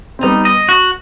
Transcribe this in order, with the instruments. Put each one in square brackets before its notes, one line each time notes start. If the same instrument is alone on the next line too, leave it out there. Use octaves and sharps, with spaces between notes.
[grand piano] C4
[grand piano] G3 B3 [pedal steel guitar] D#4
[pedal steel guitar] D#5
F#4